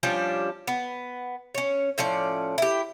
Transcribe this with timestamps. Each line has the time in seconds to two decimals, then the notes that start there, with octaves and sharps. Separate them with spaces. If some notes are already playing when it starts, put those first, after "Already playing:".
0.03 F3 G3 C#4 D4
0.67 B3
1.55 C#4 C#5
1.98 A2 F3 C#4 D5
2.58 E4 G4